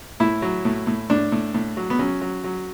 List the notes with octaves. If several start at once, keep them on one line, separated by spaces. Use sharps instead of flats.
A2 E4
F#3
A2
A2
A2 D4
A2
A2
F#3
B3
F#3 C#4
F#3
F#3